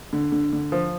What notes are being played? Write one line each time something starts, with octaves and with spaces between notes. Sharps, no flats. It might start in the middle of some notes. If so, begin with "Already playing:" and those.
D3
D3
D3
F3